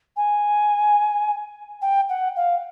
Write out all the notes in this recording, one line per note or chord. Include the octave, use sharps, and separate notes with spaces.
G#5
G5
F#5
F5